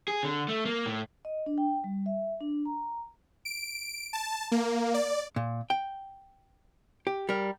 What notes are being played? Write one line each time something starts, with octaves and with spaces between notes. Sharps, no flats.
G#4
D3
A3
A#3
A2
D#5
D4
G5
G3
E5
D4
A#5
D7
A5
A#3
D5
A#2
G5
G4
G3 A#4